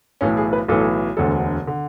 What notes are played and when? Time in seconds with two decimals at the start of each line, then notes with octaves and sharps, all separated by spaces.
0.21 B1 A2 E3 C#4
0.37 G#4
0.53 B4
0.68 B1 A2 E3 A4
1.17 E1 D2 D3 A4
1.67 D3